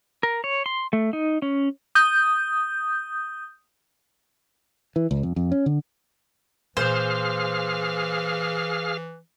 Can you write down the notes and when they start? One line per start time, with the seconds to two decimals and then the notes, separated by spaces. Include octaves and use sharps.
0.23 A#4
0.44 C#5
0.66 C6
0.93 A3
1.13 D#4
1.42 C#4
1.95 D#6 G6
4.96 E3
5.11 C#2
5.23 F2
5.36 F2
5.52 C#4
5.66 D3
6.77 A#2 E3 G#4 C5 F5 F6